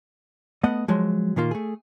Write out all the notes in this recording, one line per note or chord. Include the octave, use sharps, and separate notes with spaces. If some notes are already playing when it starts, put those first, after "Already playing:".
A3 B3 D#5 F#5
F3 F#3 G#3
A#2 D#3 A#3 F4
A3 G#4